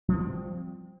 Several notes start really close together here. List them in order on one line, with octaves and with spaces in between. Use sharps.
F3 B3 G3 C4